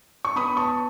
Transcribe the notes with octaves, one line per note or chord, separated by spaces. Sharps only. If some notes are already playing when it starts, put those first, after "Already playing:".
C#6
B3 B5 D#6
A5 C#6